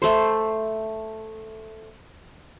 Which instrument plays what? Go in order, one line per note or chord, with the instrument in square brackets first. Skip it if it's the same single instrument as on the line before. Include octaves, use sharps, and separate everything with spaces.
[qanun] A3 C5